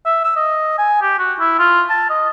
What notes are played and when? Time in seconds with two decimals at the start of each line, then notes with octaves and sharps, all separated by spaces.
0.06 E5
0.24 E6
0.36 D#5
0.78 G#5
1.02 G4
1.19 F#4
1.40 E4
1.59 F4
1.89 A5
2.10 D#5